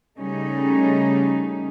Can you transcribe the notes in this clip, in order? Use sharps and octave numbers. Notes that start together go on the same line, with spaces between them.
C#3 G3 A3 C#4 D#4